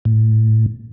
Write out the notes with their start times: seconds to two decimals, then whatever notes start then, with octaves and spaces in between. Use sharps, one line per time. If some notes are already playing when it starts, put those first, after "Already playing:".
0.05 A2